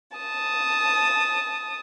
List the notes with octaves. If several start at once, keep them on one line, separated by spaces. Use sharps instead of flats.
A5 D#6